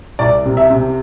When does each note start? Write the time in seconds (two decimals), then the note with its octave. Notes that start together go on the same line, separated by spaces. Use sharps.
0.19 C2 D5
0.46 C3
0.57 E5
0.70 C3